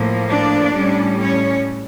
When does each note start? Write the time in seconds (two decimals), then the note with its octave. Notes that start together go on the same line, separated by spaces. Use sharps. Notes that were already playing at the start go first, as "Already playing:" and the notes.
Already playing: A2 F3 A#3
0.28 D4 D5
0.75 A2 G3 C#4
1.20 C#4 C#5